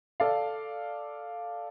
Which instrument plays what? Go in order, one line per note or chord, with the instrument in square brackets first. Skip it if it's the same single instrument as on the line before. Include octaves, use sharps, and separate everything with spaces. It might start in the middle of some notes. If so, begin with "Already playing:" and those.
[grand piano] A4 D5 F5